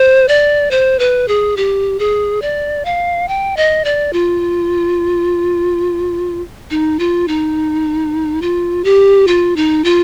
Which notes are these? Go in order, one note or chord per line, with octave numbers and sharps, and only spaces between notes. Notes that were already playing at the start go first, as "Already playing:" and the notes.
Already playing: C5
D5
C5
B4
G#4
G4
G#4
D5
F5
G5
D#5
D5
F4
D#4
F4
D#4
F4
G4
F4
D#4
F4